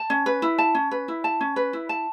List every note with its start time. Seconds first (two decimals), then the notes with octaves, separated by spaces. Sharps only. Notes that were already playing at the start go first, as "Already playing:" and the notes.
Already playing: A5
0.10 C#4
0.26 B4
0.42 E4
0.58 A5
0.75 C#4
0.91 B4
1.08 E4
1.24 A5
1.41 C#4
1.56 B4
1.73 E4
1.89 A5